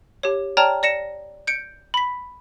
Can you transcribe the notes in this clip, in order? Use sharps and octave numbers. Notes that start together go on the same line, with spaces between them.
G4 C#5
C#5 D5 G5 A5 A#5 F6
D5 A#6 C#7 E7
G6 C#7 D7
B5 B6